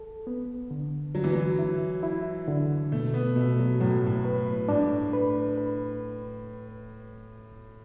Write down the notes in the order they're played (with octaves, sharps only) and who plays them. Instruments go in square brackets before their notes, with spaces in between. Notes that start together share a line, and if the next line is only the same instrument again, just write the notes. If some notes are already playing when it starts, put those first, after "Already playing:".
Already playing: [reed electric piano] A4
B3
D3
[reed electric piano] D3 [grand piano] F#3
[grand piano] E3
F#3
[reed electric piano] E4
E4
D3
[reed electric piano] B2 [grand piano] A3
[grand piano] B3
[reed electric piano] B2 [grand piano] A3
[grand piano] F#3
[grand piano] A2 [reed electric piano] F#3
[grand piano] A2
[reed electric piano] B4
[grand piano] A2 [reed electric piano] D4
[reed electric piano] B4
B4